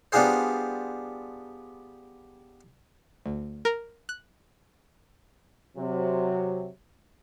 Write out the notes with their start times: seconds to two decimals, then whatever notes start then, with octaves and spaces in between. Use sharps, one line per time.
0.12 G3 B3 D4 F4 G#4 C5
3.26 D2
3.65 A#4
4.09 F#6
5.77 C3 F#3